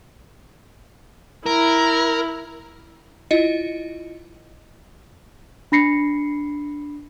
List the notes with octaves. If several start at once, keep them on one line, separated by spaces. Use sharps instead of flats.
E4 A#4
E4 F4 D#5 C#7
D4 B5 A#6 C7 C#7